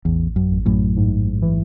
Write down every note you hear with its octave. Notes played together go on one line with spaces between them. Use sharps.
A1 E2
F#2
A1
F#2 A2
G#2
E3